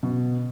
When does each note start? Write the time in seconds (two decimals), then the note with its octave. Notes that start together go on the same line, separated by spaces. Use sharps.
0.03 B2